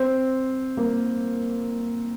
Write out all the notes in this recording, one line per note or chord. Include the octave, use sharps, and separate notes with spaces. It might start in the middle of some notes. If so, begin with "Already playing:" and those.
Already playing: C4 C5
A#3 A#4